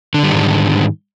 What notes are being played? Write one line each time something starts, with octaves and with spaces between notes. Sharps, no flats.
G#2 D3 D#3 G3 D4